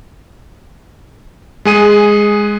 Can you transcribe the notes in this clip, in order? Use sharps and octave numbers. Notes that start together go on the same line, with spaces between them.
G#3 G#4 D#7